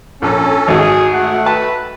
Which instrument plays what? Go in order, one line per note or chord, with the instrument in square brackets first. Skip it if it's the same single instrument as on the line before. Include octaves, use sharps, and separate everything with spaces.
[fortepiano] A#1 [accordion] C#4 A4
[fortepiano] G#1 [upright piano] F#4 D#5 [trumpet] G#4
[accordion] A3 [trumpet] F#5
[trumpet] B4 [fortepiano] A5